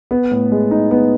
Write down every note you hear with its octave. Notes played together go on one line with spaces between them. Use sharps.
B3
A2
G#3
D#4
B3